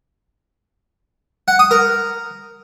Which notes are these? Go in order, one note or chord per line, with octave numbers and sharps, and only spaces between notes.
F#5
D#6
A#4